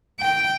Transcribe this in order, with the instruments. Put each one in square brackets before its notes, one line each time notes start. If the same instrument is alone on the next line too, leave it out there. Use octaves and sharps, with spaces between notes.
[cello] G5